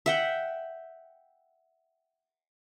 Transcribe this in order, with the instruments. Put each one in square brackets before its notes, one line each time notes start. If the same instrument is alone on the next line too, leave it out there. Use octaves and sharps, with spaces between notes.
[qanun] E5 F#5 G5